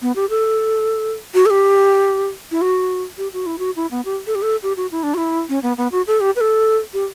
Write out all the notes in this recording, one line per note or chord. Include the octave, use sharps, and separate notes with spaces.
B3
G4
A4
F#4
A4
G4
E4
F#4
G4
F#4
E4
F#4
E4
B3
G4
A4
G4
A4
G4
F#4
E4
D4
F#4
E4
C#4
B3
B3
F#4
A4
G4
B4
A4
G4